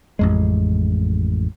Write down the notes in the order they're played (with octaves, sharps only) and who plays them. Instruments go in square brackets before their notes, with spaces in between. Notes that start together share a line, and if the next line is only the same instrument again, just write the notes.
[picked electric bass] A1 F2 G#3